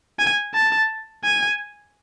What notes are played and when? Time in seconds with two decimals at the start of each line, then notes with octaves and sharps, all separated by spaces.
0.19 G#5
0.54 A5
1.24 G#5